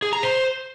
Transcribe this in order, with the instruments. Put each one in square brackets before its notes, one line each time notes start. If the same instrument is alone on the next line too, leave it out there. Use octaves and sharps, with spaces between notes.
[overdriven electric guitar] G#4
A#5
C5